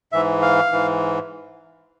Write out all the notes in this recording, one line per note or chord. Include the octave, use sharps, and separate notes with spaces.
G#2 E3 E5
F5
G#2 E3